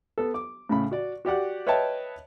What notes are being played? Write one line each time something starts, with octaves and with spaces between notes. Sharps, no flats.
B3 A4
D6
A2 C#3 B5
F#4 D5
F#4 G4 D5 F#5
B4 C#5 D#5 E5 G5 A5